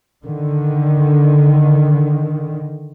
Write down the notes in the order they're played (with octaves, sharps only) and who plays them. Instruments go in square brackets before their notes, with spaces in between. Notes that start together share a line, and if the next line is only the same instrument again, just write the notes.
[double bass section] D3 D#3